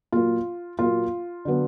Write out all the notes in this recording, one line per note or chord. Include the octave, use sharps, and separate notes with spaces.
A#2 F#3 A#3 F4
A#2 F#3 A#3 F4
D3 F#3 B3